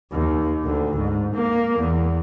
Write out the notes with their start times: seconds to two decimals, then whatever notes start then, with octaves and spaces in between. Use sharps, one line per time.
0.12 D#2
0.64 D2
0.98 G#2
1.35 A#3
1.79 E2